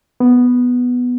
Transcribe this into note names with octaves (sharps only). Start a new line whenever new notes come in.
B3